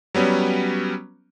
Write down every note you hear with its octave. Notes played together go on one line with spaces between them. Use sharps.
F#3 G3 B3 C#4